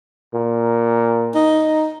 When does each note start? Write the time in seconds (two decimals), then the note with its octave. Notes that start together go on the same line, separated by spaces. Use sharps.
0.35 A#2
1.35 D#4